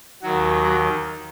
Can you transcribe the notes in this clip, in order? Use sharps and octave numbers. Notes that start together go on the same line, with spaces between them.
D#2 D#3 F#3 F#4
F#3 F#4